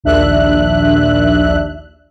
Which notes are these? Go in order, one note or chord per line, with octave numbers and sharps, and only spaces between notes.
A#1 D#2 D4 E5 F#6